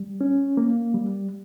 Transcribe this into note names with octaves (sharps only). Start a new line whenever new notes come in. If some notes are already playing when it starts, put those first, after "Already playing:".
Already playing: G3
C#4
A#3
G3